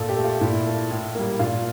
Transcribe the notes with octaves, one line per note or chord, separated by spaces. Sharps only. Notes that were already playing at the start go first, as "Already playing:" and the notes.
Already playing: A#2 A4
G4
A3
F4
A#2 E4
A3
A2
G3 A#3
A#2 F4